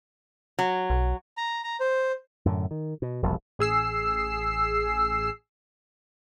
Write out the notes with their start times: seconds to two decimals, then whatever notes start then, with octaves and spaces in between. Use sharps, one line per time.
0.59 F#3
0.90 B1
1.37 A#5
1.64 A#5
1.80 C5
2.45 F#2 A2 D3
2.71 D#3
3.02 B2
3.22 E1 A#1 F2 G3
3.59 A1 G#4 E6 C7